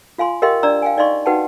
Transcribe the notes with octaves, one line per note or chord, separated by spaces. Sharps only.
F4 F5 G#5 C6
G4 A#4 D#5 F5 G5 C6
D4 D5 A#5 E6
F5 G5 G#5
D#4 D5 D#5 F5 C6 C#6
D#4 F#4 B4 F#5 G5 A5